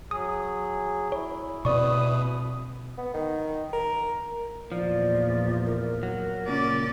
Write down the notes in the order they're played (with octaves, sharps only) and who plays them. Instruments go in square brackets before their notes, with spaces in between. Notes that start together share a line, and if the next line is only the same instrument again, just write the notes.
[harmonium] F#3 G#4 [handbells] D#6
[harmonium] E4 [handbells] C#5
[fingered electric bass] B2 C4 [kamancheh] B4 D#6 [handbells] D5 C#6
[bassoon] B3
D#3
A#4
[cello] E2 A#2 [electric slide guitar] F3 [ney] D5
[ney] A#4
[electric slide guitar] F#3
[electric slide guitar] A#2 C#3 [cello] C#4 D5